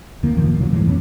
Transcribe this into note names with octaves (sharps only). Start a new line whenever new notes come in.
D#2 D#3 A#3
F#1 A#2 F3 A#3
C2 F#3
G#2 E3 G#3
F2 A#2 B3 C#4